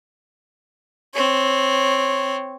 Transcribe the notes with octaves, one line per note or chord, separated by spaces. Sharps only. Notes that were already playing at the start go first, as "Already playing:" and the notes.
C4 C#5